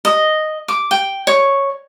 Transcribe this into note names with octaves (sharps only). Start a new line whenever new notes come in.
D#5
D6
G5
C#5